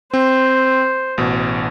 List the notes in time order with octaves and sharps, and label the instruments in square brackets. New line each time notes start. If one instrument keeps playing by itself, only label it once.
[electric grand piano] C4 [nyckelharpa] C5
[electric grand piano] A1 B2